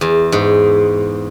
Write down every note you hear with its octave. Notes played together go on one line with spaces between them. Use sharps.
E2
G#2